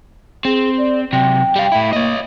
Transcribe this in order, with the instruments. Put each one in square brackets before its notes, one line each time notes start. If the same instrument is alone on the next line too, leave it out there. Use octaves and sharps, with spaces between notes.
[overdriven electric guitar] C4 [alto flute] G#4
[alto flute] D5
[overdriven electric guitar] C3 F#3 [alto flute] G5
[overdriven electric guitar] G3 F5
A2 E4
[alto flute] A#3 [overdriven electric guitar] C#5 D#5